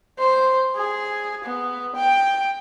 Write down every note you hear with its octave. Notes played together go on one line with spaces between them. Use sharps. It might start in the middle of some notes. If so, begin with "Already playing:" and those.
C5
G#4
B3
G5